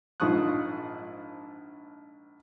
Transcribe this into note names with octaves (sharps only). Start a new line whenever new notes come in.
A#1 G#2 F3 C#6 D#6 F#6